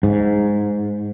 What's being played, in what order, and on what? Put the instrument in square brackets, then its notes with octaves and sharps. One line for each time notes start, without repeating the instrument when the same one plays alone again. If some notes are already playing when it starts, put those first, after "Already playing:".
[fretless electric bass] G#2